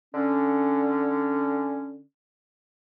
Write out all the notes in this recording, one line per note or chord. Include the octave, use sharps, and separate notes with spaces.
D3 C#4